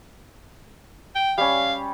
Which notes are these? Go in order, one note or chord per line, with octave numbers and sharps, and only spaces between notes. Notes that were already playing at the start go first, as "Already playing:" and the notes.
G5
G3 C#4 F5